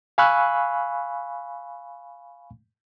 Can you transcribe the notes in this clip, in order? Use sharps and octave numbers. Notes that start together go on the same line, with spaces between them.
F5 G#5 B5 C#6 E6 F#6